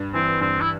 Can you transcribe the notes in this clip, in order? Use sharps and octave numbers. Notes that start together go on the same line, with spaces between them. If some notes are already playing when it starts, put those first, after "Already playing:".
Already playing: G2
E3 C4
G2 C4
E4